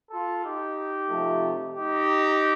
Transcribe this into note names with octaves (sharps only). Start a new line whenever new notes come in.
F4 A4
D#4 G4
C3 F3 A3
D#4 G4